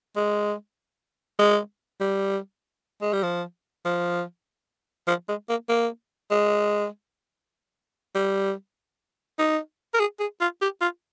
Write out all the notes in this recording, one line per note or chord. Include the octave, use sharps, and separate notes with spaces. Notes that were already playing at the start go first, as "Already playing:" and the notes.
G#3
G#3
G3
G#3
G3
F3
F3
F3
G#3
A#3
A#3
G#3
G3
D#4
A#4
G#4
G#4
F4
G4
F4